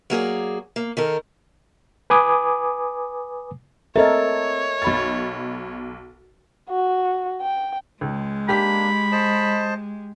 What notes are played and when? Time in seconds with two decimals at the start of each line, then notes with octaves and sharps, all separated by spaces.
0.10 F#3 A#3 G#4 D5
0.76 A#3
0.97 D#3 A4 A#4
2.10 B4 G#5 D6 D#6
3.96 C4 A4 A#4 C#5 D#5 E5 A6
4.82 B1 B5 A6
6.70 F#4
7.41 G5
8.01 C#2 G#3
8.49 A#3 D4 G4 B5 B6
9.12 C5 D#5 A5